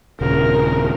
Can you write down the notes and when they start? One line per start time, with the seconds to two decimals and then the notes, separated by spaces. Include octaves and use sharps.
0.21 D#1 C#3 A#4